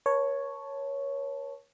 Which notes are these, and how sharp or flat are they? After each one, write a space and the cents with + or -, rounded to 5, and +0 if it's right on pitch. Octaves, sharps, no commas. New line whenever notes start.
A#4 +45 C#5 +0 A5 +0